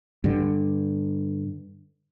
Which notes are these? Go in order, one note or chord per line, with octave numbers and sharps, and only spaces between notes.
G2 D3